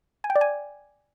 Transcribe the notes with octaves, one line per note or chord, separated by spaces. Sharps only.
G#5
G5
D5
G#5